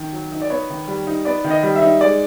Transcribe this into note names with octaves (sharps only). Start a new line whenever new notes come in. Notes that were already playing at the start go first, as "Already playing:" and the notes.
Already playing: D#3
F#3
D#4
D5
B3 C#5
D#3
G3
D#4
B3 D5
D#3
D#5
G3
E5
D#4
G#3 D5